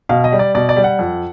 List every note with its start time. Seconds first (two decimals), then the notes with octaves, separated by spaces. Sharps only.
0.09 B2 F5
0.24 D#5
0.32 G3
0.39 D5
0.55 B2 D5
0.69 D5
0.76 G3
0.84 F#5
0.99 F2